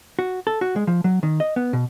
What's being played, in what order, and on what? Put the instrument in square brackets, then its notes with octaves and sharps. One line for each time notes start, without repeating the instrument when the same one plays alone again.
[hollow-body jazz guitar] F#4
A4
F#4
G#3
F3
F#3
D#3
D#5
B3
B2